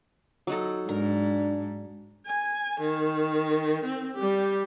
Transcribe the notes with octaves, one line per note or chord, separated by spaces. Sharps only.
F#3 D#4 A4
G#2 D4 A#4
G#5
D#3
C4
G3 G4